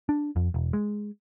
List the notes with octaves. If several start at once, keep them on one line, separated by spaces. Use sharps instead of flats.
D4
F2
E1
G#3